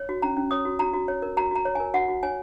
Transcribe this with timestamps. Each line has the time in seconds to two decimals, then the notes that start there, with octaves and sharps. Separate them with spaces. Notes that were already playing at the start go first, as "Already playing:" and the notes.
Already playing: C#5
0.09 F#4
0.22 C#4 A#5
0.37 C#4
0.51 C#5 D#6
0.65 F#4
0.79 F#4 A#5
0.93 F#4
1.08 C#5
1.22 A#4
1.37 F#4 A#5
1.51 F#4 A#5
1.65 C#5
1.75 G#5
1.80 A#4
1.94 F#4 F#5
2.08 F#4
2.23 C#5 G#5